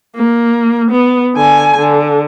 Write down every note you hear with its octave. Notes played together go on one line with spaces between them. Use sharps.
A#3
B3
D3 G#5
D3